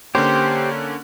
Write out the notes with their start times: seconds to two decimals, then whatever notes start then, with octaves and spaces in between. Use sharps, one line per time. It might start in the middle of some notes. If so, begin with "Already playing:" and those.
0.15 D3 A#3 C#4 G4 C5